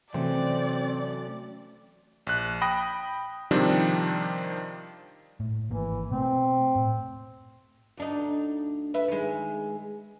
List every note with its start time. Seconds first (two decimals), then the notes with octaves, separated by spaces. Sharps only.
0.14 C3 E3 F#3 A3 C4 C#4 D5
2.27 A#1 F#6
2.62 G5 B5 D#6 A#6
3.51 C3 D#3 F3 G3 C4 D4
5.40 A2
5.70 G#1 E3 A#3
6.11 B2 A3 C4
6.76 A2
7.97 D2 D4 D#4
8.94 B4 E5
9.08 D#3 G#3